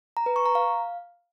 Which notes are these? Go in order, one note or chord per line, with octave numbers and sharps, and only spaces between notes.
A#5
B4
C#6
A#5
F5